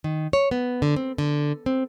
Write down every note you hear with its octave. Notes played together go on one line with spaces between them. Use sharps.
D#3
C#5
B3
D3
C4
D3
C4